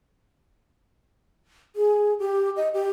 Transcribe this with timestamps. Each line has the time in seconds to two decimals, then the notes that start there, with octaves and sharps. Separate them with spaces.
1.76 G#4
2.20 G4
2.56 D#5
2.74 G4